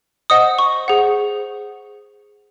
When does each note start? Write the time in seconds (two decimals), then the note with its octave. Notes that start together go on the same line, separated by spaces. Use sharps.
0.30 C5 D#5 F#5 D#6
0.59 C#6
0.88 G#4 C5 F#5